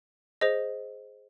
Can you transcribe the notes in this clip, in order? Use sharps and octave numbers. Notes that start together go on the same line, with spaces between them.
G#4 C5 D#5